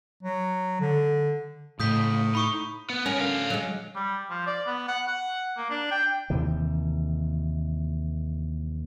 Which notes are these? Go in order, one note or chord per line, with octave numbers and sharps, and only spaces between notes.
F#3
D3
A2 C#3 A3 D#5 D#6 G6 B6
D#4 B5 C#6 D#6
B3
C#4 F#4 A#4 B4
D3 F5
F#3 G#3
G3
F3
D5
B3
F#5
F#5
A#3
D4
G5
D#2 C3 E3